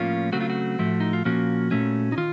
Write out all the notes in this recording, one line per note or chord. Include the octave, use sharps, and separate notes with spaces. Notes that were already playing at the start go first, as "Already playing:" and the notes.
Already playing: A2 F3 A#3 C#4 F4
C#3 F#3 A3 C4 F#4
F4
F#4
A2 F3 A3
D#4
F4
A#2 F3 A#3 C#4 F#4
A#2 A3 C#4
D#4
D#3 F4